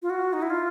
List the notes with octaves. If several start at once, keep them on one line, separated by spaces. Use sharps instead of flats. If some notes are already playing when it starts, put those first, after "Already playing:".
F4
F#4
D#4
E4
F4